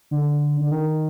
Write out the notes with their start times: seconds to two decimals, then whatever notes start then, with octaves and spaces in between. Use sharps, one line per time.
0.11 D3
0.61 D3
0.71 D#3